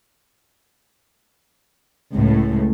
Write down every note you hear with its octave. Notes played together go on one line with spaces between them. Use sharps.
C#2 A2